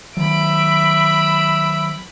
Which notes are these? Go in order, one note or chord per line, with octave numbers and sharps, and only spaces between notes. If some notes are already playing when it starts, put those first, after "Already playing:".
D#3 F#3 E5 B5 D7